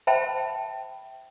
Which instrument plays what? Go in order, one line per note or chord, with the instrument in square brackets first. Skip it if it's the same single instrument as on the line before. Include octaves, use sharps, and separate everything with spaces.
[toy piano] C5 E5 G5 A5 B5